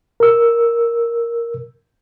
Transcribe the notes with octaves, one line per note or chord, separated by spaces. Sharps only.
A#4 E6